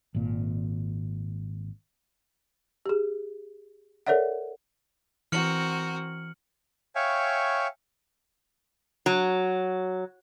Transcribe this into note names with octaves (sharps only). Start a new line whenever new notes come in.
G#1 A#2
G4 G#4
A4 A#4 C#5 D5 E5 F#5
E3 C4 F#4 A#4 F6 C#7 F#7
C#5 E5 F5 G5 G#5 C#6
F#3